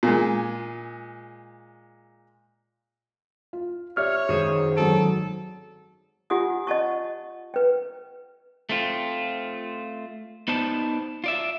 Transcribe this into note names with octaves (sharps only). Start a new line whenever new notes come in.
A#2 G#3
F4
G4 C#5 D5 E5 F6
F#2 D#3 G#3 F#4 G#4 C5
G#1 F#3 A4 D7
F4 G4 F#5 G#5 D#6
D#5 F#5 A5 C#6
B4 G5
A3 C4 F4
B3 D#4 C5 D5 A5
F4 D5 E5